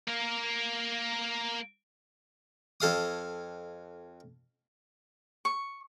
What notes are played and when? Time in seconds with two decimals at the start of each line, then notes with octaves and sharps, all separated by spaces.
0.08 A#3 A#4
2.80 F2 A4 F5 D#6
5.45 C#6